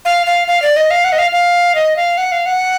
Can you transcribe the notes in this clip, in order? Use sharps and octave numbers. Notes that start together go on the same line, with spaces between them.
F5
F5
F5
D5
D#5
F5
F#5
D#5
F5
F5
D#5
F5
F#5
F5
F#5